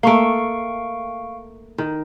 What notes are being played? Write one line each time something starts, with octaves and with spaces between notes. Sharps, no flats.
A3 A#3 F5 C#6 D7
D#3